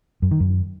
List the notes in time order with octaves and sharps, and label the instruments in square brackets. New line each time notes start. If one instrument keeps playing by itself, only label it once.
[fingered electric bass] F#2
D#3
F#2